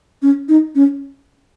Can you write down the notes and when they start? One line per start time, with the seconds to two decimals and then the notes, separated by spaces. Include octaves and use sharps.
0.22 C#4
0.49 D#4
0.75 C#4